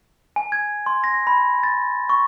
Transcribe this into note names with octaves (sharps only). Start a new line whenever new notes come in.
G#5
G#6
C6
A#6
B5
A6
C#6